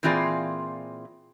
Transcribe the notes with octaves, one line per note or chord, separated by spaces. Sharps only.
A#2 E3 C4 F4 G#4 D5